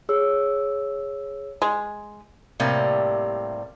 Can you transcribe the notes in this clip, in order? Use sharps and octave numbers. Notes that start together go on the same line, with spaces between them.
G#4 C#5 E6
G#3
A2 C3 G3 A#3